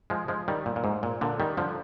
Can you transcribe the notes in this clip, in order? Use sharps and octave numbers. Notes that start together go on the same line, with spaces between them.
F3 G#3
F3 G#3
D#3 G3
A#2
A#2
G#2
A#2
A#2 D3
D#3 G3
D3 F3